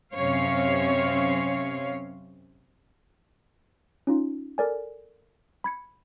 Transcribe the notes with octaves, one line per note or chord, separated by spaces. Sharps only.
F#2 C3 C4 C#4 C#5 F5
C#4 D#4 F4
A4 A#4 D5 G#5
B5 G#6 C#7